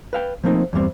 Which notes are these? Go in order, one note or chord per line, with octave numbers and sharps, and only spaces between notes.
B4 F5 G5
F3 A3 A#3 C4 D#4
E2 G2 G3 C4